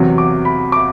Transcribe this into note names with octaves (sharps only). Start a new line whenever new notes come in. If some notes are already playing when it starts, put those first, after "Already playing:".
Already playing: E2 C3 F#3
D6
B5
D6